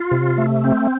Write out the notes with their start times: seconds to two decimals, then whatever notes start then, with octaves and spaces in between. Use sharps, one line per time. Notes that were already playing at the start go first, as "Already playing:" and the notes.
Already playing: F4
0.11 C3
0.38 A3
0.64 C4